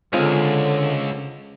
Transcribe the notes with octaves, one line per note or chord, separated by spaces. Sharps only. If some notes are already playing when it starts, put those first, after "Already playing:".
C#2 D3 G#3 C4 F4